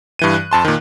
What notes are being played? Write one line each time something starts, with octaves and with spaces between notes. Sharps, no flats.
G2 E3 D#7
F#6
F2 A5 C6
A#2 D#3